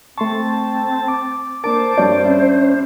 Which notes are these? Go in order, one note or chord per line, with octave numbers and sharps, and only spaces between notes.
A3 C4 A5 C6 C#6
D6
A#3 D4 A#4 C5 A5 D6
G2 C4 C#5 D5 G6
C#4 E5